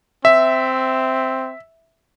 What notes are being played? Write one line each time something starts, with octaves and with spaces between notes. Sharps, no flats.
C4 E5